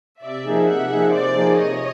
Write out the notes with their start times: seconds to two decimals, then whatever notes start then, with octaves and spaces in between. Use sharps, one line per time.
0.22 C3 D5 E5
0.45 F3 A#3 D#4 G#4
0.67 C3 E5 F#5
0.89 F3 A#3 D#4 G#4
1.12 C3 C5 D5
1.34 F3 A#3 D#4 G#4
1.57 C3 C#5 D#5